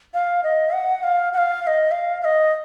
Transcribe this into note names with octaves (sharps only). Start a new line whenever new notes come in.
F5
D#5
F#5
F5
F#5
F5
F5
D#5
F5
F5
D#5